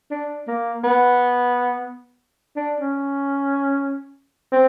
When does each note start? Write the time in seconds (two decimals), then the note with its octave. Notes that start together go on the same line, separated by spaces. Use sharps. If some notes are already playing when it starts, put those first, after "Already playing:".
0.11 D4
0.48 A#3
0.84 B3
2.56 D4
2.81 C#4
4.52 C4